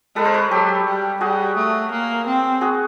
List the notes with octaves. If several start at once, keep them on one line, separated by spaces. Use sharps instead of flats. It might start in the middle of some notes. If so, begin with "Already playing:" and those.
G#3 A4 B4
A#4 C5
B4 C#5
F#3 G4 A4
G3
G3 F#4 G#4
A3
A#3
C4
F#4 G#4